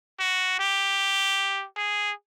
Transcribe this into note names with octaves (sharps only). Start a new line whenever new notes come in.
F#4
G4
G#4